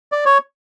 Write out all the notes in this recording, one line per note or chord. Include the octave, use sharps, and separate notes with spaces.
D5
C#5